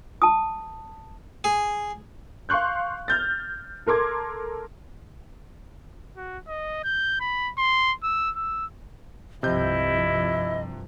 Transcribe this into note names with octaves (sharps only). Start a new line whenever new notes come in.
A5 D#6
G#4
F5 C6 C#6 F#6 G6
F6 G6 A6
A4 A#4 C6 D6 G#6
F#4
D#5
G6
B5
C6
E6
E6
C2 G2 C3 F3 E4 D#5 G6